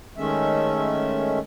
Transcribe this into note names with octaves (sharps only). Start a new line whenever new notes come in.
D#3 G#3 A3 C#4 E5